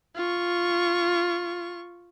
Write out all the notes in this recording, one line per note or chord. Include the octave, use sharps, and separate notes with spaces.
F4 C#6